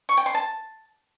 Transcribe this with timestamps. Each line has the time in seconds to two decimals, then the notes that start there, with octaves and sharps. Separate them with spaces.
0.09 C#6
0.17 G5
0.26 C6
0.35 A5